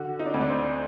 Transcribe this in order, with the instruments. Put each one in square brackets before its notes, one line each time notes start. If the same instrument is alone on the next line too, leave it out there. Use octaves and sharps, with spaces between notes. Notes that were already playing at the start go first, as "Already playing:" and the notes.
Already playing: [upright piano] D3 F#4
D#4
D4
D2 C4
D4
C5